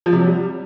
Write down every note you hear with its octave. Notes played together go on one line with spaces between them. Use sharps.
F3
C3
F#3
G3